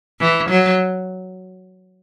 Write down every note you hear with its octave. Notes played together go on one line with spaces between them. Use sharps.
E3
F#3